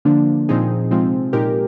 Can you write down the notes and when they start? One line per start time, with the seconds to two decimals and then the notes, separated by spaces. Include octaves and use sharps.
0.05 D3 F3 A#3 D4
0.49 A#2 F3 C4 D#4 G#4
0.90 C3 F3 G#3 C4 F4
1.33 A#2 G#3 D#4 G4 A#4